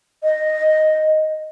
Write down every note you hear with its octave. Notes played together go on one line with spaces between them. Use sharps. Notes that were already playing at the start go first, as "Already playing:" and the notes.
D#5